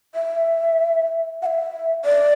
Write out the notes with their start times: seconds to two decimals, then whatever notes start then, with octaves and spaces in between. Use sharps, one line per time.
0.15 E5
1.42 F#5
1.46 E5
2.05 D5